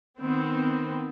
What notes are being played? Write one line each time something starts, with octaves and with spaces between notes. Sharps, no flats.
D#3 B3 C4